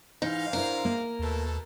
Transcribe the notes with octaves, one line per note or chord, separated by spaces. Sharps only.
G#2 E3 D#4 F5
D4 E4 A#4 C5
A#3
D#2 B2 A3 A4